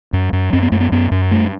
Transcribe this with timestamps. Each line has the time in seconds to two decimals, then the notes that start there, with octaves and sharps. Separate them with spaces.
0.13 F#2
0.33 F#2
0.53 F#2 C4
0.62 B3
0.72 F#2 A3
0.81 B3
0.92 F#2 B3
1.11 F#2
1.31 G2 A3